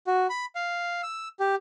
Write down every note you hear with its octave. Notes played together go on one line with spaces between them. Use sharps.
F#4
B5
F5
E6
G4